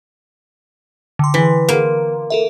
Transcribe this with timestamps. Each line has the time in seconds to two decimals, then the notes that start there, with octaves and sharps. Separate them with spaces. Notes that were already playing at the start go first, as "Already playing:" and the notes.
1.19 D3 C6
1.34 E3
1.69 A#3
2.30 A4 A#4 E5